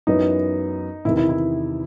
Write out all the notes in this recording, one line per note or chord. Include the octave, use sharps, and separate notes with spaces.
F#2 E3 B3 D#4
E2 C3 D#3 E4
E4
E4